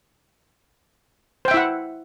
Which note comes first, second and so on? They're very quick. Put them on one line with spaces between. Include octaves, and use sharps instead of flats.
C5 G5 E5 E4 F#5